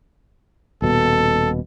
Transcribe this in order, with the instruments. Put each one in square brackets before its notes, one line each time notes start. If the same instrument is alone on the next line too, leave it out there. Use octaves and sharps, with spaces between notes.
[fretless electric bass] D#1 B2 [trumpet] A4